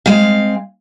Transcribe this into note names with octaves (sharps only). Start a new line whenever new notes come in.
G#3 C4 F5